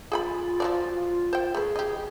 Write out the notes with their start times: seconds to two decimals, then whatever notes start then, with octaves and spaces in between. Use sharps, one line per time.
0.12 F4 G#4 G5 B5
0.60 F3 F#3 D5
1.33 C5 G5
1.55 A3 G#4 B4
1.76 G4 D#5